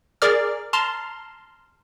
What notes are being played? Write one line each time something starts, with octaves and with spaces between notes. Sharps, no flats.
G#4 A#4 D5 D6 F6
A5 A#5 C6 F6